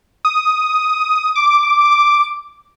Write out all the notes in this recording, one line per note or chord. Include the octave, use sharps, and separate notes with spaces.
D#6
D6